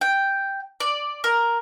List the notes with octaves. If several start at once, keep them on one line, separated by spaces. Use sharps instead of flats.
G5
D5
A#4